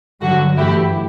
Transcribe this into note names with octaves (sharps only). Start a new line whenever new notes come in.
G2 D3 F#3 F#4
F#2 E3 A3 E4 G4